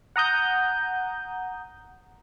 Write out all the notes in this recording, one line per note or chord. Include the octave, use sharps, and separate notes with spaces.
F#5 A#5 D#6 G6